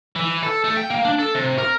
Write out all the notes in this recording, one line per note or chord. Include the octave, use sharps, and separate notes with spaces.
E3
A4
A3
G5
A#3
D4
A4
C3
A#4